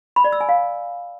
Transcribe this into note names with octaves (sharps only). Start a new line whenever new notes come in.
B5
D5
E6
G#5
F5